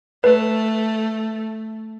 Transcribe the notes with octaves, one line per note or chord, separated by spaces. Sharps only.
A3 B4